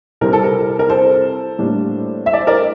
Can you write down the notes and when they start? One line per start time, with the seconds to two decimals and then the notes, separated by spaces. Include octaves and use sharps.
0.21 C3 G3 C4 E4 A#4
0.33 A4
0.44 A#4
0.79 A#4
0.89 A4 C5
1.58 A2 G3 A#3 D4
2.26 E5
2.33 D5
2.40 C5
2.47 A#4 D5